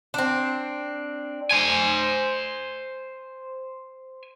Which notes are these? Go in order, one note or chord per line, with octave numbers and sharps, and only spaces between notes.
C4 D4
C5 G#5